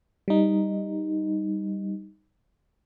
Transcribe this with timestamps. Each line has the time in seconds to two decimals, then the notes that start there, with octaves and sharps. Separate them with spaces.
0.28 G3 D#4